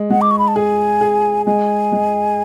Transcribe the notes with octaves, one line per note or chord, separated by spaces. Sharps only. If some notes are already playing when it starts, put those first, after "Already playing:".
Already playing: G#3
G#3 F#5
D6
C#6
B5
A5
G#4 G#5
G#4
G#3 G#5
G#3